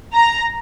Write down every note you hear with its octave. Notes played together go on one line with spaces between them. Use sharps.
A#5